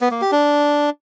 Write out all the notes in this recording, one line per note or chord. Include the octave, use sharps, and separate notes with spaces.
B3
A#3
G4
D4